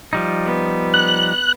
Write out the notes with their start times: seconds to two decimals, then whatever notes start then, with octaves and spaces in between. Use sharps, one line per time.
0.13 F3 G3 D#4
0.46 B3
0.94 F#6